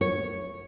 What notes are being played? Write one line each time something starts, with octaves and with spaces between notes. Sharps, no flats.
C#5